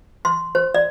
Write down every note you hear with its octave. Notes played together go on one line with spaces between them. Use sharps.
C6
C5
D5